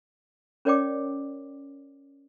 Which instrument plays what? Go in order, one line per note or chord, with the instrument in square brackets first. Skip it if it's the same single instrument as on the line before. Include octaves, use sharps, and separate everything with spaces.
[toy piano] C#4 A#4 C#5 D5 G5 D6